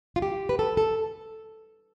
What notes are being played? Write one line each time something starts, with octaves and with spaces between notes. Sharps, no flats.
F4
G4
B4
A4
A4